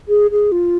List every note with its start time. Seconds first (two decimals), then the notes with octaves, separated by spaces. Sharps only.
0.08 G#4
0.31 G#4
0.52 F4